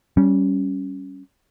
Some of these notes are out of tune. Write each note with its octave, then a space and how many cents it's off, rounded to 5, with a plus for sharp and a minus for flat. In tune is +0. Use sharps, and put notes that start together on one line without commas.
G3 -15 C#4 +0